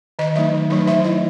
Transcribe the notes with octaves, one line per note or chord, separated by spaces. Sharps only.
D#3 D#5
F#3 A3 D#4 E5
D#3
F#3 A3 D#4
E3 E5
A3 E4 D#5